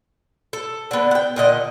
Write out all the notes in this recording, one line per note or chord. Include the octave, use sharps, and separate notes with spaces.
A4
D3 B3
F#5 G5
A#2 D3 D#5